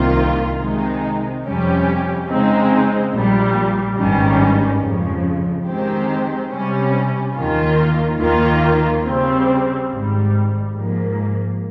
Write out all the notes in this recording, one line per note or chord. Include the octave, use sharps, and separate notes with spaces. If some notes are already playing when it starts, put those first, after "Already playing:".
Already playing: C2 C3 D#3 A#3 F4
C3 D#3 G#3 D#4
F2 C3 G3 C#4 G4
C#3 G#3 C4 D#4
A#1 A#2 G3
G#1 G2 D#3 G3 C#4
F2 C#3 F3
D#3 G#3 C4 G4 C5
C3 G3 C#4
D#2 D#3 A#3 F4
D#2 D#3 A#3 F4
C#3 G3 C4
G#1 G#2 G3
G#2 F3 A#3